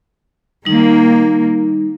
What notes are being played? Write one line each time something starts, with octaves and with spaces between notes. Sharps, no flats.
D#3 G3 A#3 D#4